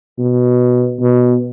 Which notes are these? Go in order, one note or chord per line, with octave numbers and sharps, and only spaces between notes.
B2
B2